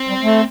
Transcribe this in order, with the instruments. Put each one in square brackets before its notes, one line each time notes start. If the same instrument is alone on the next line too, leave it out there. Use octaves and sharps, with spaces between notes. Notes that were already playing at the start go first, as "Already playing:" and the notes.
Already playing: [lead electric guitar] C4
[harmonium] G3
A3